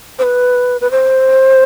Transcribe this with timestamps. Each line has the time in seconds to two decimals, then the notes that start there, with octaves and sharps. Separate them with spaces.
0.19 C5
0.23 B4
0.81 B4
0.91 C5